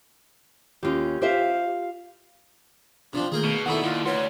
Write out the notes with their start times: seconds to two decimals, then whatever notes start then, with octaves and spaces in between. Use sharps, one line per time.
0.83 D#2 C#4 F4 G4
1.22 F4 G4 C5 E5 F5
3.13 C3 F3 C4 D4
3.32 D#3 A3 A#3 G#4 A#4 G5
3.44 B2
3.66 D#3 D4 E4 A4 F#5 B5
3.84 D#2 F4
4.05 D2 B4 C#5 F#5 C6